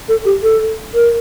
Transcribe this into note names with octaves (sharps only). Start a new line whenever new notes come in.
A4
G4
A4
A#4